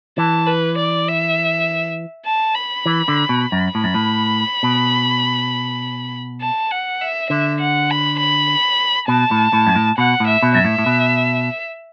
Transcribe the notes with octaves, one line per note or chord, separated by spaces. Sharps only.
E3 A5
B4
D5
E5
A5
B5
E3
D3
B2
F#2
A2 B5
F#2
A2
B2
A5
F#5
E5
D3 E5
F#5
B5
B5
B2 A5
A2
A2
F#2
A2
B2 F#5
A2
E5
B2
F#2 E5
A2
A2
B2